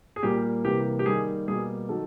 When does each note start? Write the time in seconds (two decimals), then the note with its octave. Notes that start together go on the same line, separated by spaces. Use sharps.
0.16 G#4
0.23 A#2 G3 A#3 G4
0.64 C3 E3 G3 A#3 G4
0.99 G4
1.05 D#3 G3 A#3 G#4
1.47 B2 G3 A#3 G#4
1.89 D#3 F#3 A4